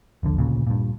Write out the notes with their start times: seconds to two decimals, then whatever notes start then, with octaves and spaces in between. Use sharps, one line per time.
0.23 D#1 A#1 D3
0.37 D2 A#2 C#3
0.67 G2 A#2